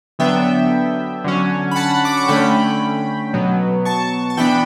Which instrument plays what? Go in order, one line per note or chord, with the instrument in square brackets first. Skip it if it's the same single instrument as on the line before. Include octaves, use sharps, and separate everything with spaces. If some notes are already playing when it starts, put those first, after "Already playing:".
[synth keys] D3 F#3 B3 D4 E5 G5
D3 F#3 C#4
B5
F#5 A5
D6
C#6
D3 A3 C#4 G5 B5
B2 F#3 B3
A5 C#6
A5
E3 B3 D4 G5 B5